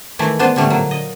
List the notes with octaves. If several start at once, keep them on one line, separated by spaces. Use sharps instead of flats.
D#3 E3 A3 E4
B3 D4 C5
A2 D3 G3 A3
A#2 F#3
D#5